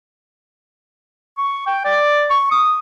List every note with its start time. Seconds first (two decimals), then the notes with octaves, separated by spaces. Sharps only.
1.38 C#6
1.67 G5
1.85 D5
2.30 C#6
2.51 D#6